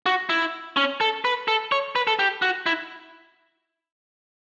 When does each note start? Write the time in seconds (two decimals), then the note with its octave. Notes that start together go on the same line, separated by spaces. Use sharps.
0.06 F#4
0.29 E4
0.77 C#4
1.01 A4
1.25 B4
1.48 A4
1.72 C#5
1.95 B4
2.07 A4
2.19 G4
2.42 F#4
2.66 E4